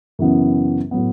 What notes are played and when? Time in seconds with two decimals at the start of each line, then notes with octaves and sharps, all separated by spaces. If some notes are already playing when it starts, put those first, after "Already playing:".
0.19 F#2 C#3 E3 B3
0.91 A2 F#3 B3